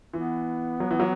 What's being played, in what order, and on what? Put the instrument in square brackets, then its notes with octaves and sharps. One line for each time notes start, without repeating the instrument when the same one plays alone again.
[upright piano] E3 [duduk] B3
[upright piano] F#3
E3
F#3